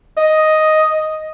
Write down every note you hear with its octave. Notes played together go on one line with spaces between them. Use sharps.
D#5